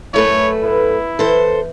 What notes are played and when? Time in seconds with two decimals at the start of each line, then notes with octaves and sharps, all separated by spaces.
0.14 F#2 A3 E4 B4 C#5
0.64 B3 E4
1.19 E3 A4 C5 G5